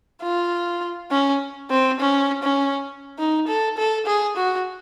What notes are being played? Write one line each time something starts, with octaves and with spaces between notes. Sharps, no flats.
F4
C#4
C4
C#4
C#4
D#4
A4
A4
G#4
F#4